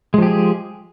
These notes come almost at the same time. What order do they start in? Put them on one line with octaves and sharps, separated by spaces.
G#3 F3 G4 G#4